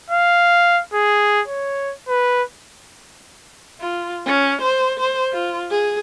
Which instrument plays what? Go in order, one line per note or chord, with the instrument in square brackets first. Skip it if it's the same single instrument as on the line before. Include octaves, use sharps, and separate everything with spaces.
[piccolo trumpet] F5
G#4
C#5
B4
[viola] F4
C#4
C5
C5
F4
G#4